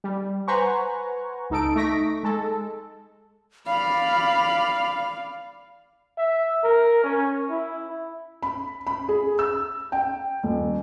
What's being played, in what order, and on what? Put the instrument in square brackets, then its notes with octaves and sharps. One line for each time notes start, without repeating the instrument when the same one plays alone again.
[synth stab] G3
B4 C5 F#5 G#5 A#5 C#6
C#2 D#4 A4 D7
A3 D#4 C#6 A#6 B6 D7
G#3 A4
[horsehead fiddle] D5 F5 [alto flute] B5
[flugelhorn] E5
A#4
C#4
E4
[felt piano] B5
B5
G#4
E6
G5
D#1